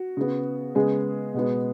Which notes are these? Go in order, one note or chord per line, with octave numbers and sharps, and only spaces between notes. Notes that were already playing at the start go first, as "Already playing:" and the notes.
Already playing: F#4
C#3 B3
C#3 G#3 B3 G#4
B2 G#3 B3